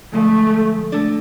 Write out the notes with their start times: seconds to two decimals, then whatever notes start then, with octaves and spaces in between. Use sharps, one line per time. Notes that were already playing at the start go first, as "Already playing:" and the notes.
0.13 D3 F3 G#3 A3
0.92 A3 D4 A4 D5